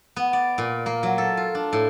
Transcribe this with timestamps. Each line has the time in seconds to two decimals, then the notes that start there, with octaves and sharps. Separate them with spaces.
0.16 B3
0.33 D5
0.58 A#2
0.86 A#3
1.03 F#3
1.18 A4
1.37 F4
1.55 D4
1.73 A2